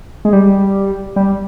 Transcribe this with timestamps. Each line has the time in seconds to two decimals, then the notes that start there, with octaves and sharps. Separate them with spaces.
0.25 G#3
0.33 G3
1.16 G3